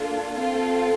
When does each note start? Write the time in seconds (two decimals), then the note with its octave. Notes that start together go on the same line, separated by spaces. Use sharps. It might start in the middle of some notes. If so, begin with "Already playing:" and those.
Already playing: A#3 D4 F4 A4
0.33 C4 F4 A4